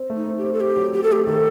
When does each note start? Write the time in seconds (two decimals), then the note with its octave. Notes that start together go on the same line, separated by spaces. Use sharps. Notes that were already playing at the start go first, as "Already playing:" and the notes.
Already playing: C4
0.10 A3
0.16 D#4
0.27 C4
0.38 G4
0.43 C4
0.53 A4
0.60 C4 G4
0.77 F#3
0.94 F#3 G4
1.03 A4
1.10 A3 G4
1.27 D#3 A4